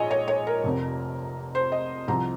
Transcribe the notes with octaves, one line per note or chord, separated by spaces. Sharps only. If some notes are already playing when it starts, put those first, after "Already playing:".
Already playing: A#1 G#2 C#5 D#5 G#5
C#5
C#5
A#4
F1 F2 C3
C5
D#5
C2 C3 F3 A#5